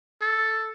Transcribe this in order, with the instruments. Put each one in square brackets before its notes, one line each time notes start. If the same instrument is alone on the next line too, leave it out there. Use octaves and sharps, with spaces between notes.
[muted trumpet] A4